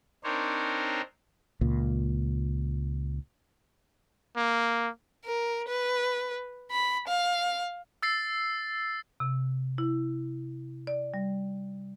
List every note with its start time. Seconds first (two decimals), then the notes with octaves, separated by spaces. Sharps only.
0.24 C4 D4 D#4 A#4 C5 C#5
1.61 C#2 A#2
4.36 A#3
5.25 A#4
5.68 B4
6.71 B5
7.08 F5
8.02 E6 A6 C7
9.20 C3
9.78 E4
10.87 D5
11.14 G3